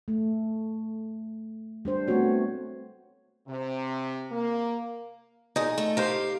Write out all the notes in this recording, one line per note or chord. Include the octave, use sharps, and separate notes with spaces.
A3
G3 D4 C5
A3 B3 C4 F#4 C#5
C3
A#3
A#2 D#4 G#4
A3
G4 A#4 C5 F5